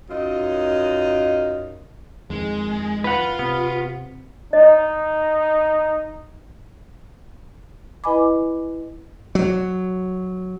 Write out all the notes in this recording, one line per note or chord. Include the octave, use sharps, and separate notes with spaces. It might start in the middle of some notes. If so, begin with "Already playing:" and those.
F#2 D#4 F4 D#5
F2 D#3 G#3
F4 B4 F#5
C3 B3
D#4 D#5
E4 B4 D#5 G#5 B5 D6
F#3